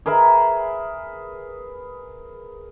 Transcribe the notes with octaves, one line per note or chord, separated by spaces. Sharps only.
G#4 A#4 B4 E5